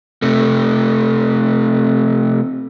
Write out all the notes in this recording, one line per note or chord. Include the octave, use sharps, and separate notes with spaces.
C3 A3